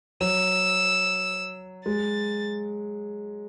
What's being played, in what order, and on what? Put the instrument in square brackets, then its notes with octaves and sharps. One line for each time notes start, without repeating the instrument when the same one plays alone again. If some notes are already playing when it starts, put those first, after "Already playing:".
[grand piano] F#3 [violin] E6
[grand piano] G#3 [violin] A6